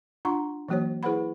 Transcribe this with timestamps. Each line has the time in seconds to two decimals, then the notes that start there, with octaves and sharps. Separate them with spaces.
0.25 D4 F4 F#5 A#5 C6 C#6
0.69 E3 F#3 A#3 F#4 C5 C#5
1.03 E4 G#4 B4 C5 F#5 B5